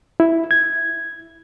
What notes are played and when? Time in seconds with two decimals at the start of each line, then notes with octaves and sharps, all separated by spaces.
0.20 E4
0.51 G#6